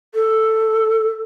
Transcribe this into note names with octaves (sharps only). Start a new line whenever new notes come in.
A4